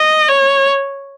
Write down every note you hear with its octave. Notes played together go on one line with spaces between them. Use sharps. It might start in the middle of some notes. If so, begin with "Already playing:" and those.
Already playing: D#5
C#5